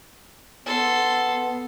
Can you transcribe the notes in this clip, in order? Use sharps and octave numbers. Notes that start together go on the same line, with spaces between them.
B3 A4 C6